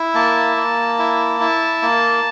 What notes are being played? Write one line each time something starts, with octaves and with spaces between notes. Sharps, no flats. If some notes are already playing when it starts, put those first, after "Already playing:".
Already playing: E4
A#3 A5
A#3
E4
E4
A#3